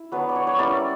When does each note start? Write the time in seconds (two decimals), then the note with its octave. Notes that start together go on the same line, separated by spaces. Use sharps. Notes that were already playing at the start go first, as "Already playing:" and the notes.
Already playing: E4
0.12 F#3 B3 D4 B4
0.29 D5
0.36 C#5
0.47 C#5
0.58 G3 A#3 C#4 E4 D5